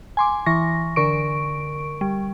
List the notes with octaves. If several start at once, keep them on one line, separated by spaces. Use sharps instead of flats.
G#5 C6 D6
E3 C#6 A#6
D3 A#4 C#6 D7
G3